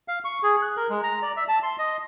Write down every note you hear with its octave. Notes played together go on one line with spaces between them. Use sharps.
F5
C#6
G#4
F#6
A#4
G#3
A#5
D5
E5
A5
C6
D#5